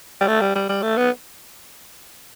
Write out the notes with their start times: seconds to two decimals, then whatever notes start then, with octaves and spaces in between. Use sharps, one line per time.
0.21 G3
0.28 A3
0.41 G3
0.56 G3
0.69 G3
0.83 A3
0.97 B3